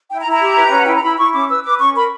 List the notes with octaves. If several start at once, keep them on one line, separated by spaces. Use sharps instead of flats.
E4 G5
A#5
E4
A#5
G4
B4
E5
C#4 F#5
E4 G5
A#5
E4 B5
E4 C#6
C#4 D6
B4 E6
B4 D6
C#4 C#6
A#4 B5